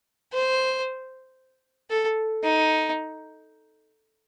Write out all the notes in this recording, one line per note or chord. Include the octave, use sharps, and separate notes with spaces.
C5
A4
D#4